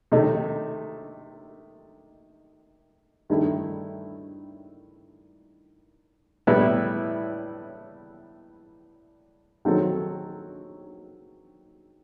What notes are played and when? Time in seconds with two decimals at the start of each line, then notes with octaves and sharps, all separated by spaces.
0.12 C3 D#3 A3 D#4
3.30 G2 D#3 A3 E4
6.47 A2 G3 B3 E4
9.65 D#3 F#3 C4 F#4 A4